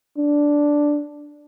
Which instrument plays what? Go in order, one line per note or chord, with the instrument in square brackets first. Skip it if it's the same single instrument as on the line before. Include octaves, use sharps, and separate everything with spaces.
[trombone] D4